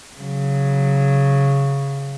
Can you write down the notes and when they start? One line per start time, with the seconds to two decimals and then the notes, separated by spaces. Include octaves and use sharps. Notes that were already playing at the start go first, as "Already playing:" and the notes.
0.16 C#3 F#3